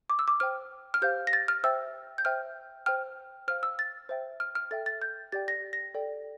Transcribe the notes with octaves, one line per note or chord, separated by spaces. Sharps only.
D6
E6
D6
C5 G5 F6
F6
G4 C5 F5 G6
A#6
A6
F6
C5 E5 G5 E6
G6
C5 E5 G5 F6
C5 G5 F6
C5 F5 F6
E6
A6
C5 E5 G5
F6
F6
A4 E5 G5 A6
A6
G6
G4 D5 G5 A6
A#6
A#6
A4 D5 G5